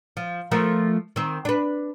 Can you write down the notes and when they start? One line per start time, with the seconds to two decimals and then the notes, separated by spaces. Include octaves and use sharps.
0.17 F3
0.51 F3 A3 A#4
1.16 D#3 C4
1.45 D4 B4